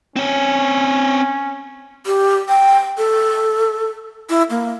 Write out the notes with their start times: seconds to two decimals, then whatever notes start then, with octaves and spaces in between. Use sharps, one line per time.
0.16 C4 C#4 C#5
2.06 G4
2.49 G5
2.98 A4
4.30 E4
4.50 A#3